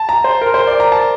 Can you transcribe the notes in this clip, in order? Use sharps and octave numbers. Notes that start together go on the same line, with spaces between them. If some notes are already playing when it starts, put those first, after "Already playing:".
Already playing: A5
A#5
C5
A#4
C5
D5
A#5
A5